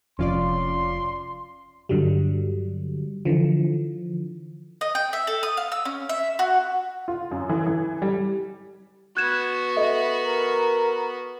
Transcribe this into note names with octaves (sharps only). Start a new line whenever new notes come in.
F1 F2 C#4 F4 D5 C6
G2 D3 F#3 G3
D3 E3 F3
D#5
G5
E5
A4
D#6
F5
E6
C#4
E5
F#4
F4
F#2
E3
E3
G3
B3 F#4 F#6 G#6 E7
A4 D#5 E5
A#4